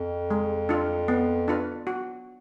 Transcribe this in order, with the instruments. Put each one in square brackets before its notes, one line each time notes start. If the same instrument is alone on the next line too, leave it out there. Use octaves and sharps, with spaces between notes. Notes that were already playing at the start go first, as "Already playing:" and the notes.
Already playing: [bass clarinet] F2
[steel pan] G#3
D4 F4
B3
D4 F4 B4
F#4